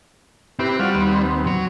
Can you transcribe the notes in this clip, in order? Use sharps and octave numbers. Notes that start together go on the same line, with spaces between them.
C4 E4 G4 B4
G3 F4 F#4 F6
D#2 B3 C4
F#3